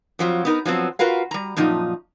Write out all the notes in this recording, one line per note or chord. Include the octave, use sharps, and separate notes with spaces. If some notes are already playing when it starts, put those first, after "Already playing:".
F2 F3 F#3
B3 D#4 A#4
F3 F#3 B3 C4
F4 F#4 A#4 B4 F5
G3 A#5
F#2 A#2 F3 D#4